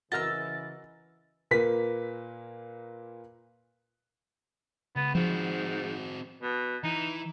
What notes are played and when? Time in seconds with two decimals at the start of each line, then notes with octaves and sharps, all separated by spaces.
0.12 C#3 E3 F#4 A#4 D#5 E6 F6 A6
1.51 A#2 A#3 B4 B6
4.96 C#2 B3
5.15 G#2 F3 C4 F#4
6.42 B2
6.84 E3 D#4